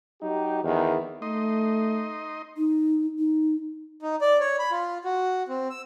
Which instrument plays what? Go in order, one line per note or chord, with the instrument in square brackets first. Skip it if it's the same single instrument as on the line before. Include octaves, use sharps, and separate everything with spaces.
[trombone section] F#3 D#4 G4
E2 D#3
[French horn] A3 [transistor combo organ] D#4 D#5 C6
[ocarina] D#4
D#4
[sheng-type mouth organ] D#4
D5
C#5
B5
F4
F#4
C4
E6